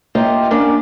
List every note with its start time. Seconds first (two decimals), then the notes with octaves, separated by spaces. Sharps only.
0.15 A#3 F4 G4 D#5 E5
0.51 A#3 C#4 D4 A#4